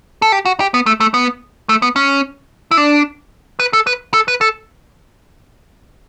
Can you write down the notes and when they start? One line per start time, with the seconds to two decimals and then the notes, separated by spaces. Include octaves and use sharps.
0.22 A4
0.32 G4
0.45 F#4
0.60 G4
0.74 B3
0.86 A3
1.00 A3
1.14 B3
1.69 A3
1.82 B3
1.96 C#4
2.71 E4
2.77 D4
3.60 B4
3.73 A4
3.87 B4
4.14 A4
4.28 B4
4.41 A4